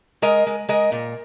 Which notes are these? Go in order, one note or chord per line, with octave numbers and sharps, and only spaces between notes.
G#3 A#4 D#5
G#3
G#3 A#4 D#5
A#2